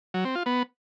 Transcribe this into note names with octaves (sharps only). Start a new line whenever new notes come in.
F#3
C4
F4
B3